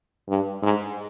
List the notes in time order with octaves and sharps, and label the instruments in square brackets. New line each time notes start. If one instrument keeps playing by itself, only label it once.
[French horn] G2
G#2